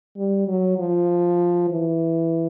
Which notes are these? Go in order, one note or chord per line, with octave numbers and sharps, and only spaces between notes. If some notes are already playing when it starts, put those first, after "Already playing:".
G3
F#3
F3
E3